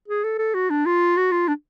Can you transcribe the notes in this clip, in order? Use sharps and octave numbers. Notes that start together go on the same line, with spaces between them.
G#4
A4
A4
F#4
D4
F4
F#4
F4
D4